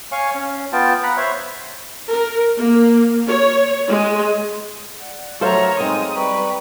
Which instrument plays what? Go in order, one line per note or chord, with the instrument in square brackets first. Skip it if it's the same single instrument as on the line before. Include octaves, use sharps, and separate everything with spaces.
[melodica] C#5 F5 G#5 C#6
C#4
B3 F4 G5 A5
B4 F#5 A#5 B5
C5 C#5 E5
[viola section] A#4
A#3
C#5
G#3
[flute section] D5 F#5
[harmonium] F#3 A3 [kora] A4 C5 F5 [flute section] A#4 [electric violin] C#5 A#5
[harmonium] G#3 D#4 [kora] C4 [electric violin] D#6
[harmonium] G3 [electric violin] B4 [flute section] G5 A#5 C#6